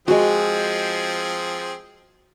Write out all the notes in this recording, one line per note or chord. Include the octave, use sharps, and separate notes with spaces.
F3 G#3 C4 F#4 G#4